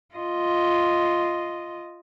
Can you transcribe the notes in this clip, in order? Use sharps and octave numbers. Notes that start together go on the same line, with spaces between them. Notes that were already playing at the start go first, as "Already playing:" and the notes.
F4 D#5